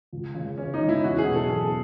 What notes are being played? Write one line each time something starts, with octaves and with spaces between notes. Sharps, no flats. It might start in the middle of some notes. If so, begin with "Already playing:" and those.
C#2
C#3 G#3 C#4
C#2 C#4
D#4
C#3 G#3 C#4
E4
E2 F#4
G#4
B2 F#3
A4
E2 G#4